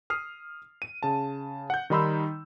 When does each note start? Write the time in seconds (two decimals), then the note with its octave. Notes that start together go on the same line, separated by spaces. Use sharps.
0.10 D#6 F6 C7
0.82 D#7
1.03 C#3 A5
1.70 F#5 G6
1.90 D#3 G3 D#4 B5 C6 E6